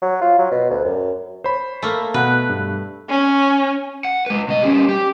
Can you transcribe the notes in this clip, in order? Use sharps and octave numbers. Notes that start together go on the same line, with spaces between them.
F#3
F4
F#3
B2
D2
F#2
C5 C#5 B5
A3 A#3
B2 B4 F#5 F#6
G2
C#4
F#5
G#3 B4
B2 D#5
G3 C#4
G4